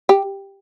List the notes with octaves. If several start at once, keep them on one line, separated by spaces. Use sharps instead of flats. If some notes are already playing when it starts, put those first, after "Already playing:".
G4